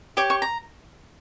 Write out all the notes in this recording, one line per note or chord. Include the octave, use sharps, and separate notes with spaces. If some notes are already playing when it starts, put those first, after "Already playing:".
G4 C#5 D6
C#6
A#5